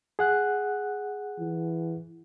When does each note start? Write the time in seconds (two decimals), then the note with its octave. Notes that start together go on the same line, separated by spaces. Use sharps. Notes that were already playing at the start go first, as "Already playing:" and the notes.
0.19 G#4 F#5 F#6
1.39 E3